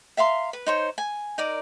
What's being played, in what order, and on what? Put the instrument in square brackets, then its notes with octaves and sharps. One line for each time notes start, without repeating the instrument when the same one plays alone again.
[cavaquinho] E5 F5 A#5 C6
B4
D#4 C5 C#5
G#5
D#4 A#4 D5